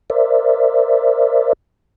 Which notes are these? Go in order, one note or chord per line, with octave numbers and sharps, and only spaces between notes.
A#4 C5 D5 E5